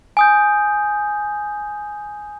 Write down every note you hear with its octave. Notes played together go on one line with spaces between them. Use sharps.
G#5 D#6 G6